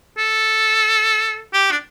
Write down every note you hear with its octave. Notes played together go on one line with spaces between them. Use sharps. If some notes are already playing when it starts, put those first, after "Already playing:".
A4
G4
D4